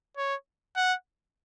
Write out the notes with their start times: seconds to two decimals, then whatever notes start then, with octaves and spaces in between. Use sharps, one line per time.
0.17 C#5
0.76 F#5